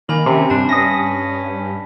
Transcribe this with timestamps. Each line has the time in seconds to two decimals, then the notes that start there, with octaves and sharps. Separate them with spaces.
0.09 D#3 A#3 G#5 B5 F#7
0.26 C3 C#4
0.50 G2 D4 A5
0.69 C#4 D#6 A#6 B6